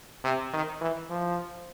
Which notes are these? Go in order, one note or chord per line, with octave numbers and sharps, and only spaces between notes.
C3
D#3
E3
F3